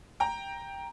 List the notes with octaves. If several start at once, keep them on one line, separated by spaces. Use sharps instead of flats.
G5 A#5